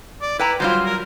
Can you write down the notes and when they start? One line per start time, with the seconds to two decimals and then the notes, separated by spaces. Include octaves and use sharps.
0.21 D5
0.39 E4 B4 G5 A#5
0.60 F#3 G3 F4 C5
0.86 A#4